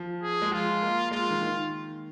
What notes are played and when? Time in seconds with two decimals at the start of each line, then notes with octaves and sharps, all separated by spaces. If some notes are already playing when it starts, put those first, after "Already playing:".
Already playing: F3
0.22 G#4
0.42 G#3
0.52 F3 F4
0.82 A#3
1.11 G#3 F4
1.30 D#3
1.41 D#3